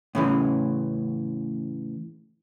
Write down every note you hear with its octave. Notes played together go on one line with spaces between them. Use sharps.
A2 C#3 E3